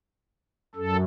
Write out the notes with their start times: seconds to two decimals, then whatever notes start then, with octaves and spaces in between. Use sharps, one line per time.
0.75 F#2 A4